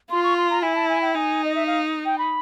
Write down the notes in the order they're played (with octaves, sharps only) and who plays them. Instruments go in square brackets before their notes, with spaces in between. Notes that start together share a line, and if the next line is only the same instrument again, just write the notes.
[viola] F4 [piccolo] C6
[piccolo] C#6
C6
A#5
[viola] E4 [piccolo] G#5
[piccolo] A5
G#5
G5
[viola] D#4 [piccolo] G#5
[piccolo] D#5
E5
F5
G5
B5